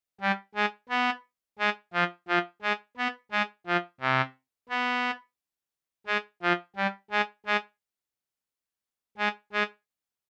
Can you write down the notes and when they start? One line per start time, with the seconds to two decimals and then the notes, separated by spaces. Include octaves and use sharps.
0.21 G3
0.55 G#3
0.89 B3
1.59 G#3
1.93 F3
2.28 F3
2.62 G#3
2.97 B3
3.32 G#3
3.66 F3
4.01 C3
4.69 B3
6.07 G#3
6.42 F3
6.76 G3
7.11 G#3
7.46 G#3
9.18 G#3
9.53 G#3